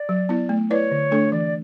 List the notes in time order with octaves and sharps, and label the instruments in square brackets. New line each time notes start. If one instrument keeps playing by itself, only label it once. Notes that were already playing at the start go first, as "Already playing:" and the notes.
Already playing: [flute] D5
[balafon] F#3
B3 E4
A3
[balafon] E4 B4 D5 [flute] C#5
[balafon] D3
A3 D4 A4
[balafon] E3 [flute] D5